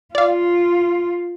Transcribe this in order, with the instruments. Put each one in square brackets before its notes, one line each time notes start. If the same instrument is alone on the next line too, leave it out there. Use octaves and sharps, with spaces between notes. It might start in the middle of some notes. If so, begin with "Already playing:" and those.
[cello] F4 [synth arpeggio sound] D5 F5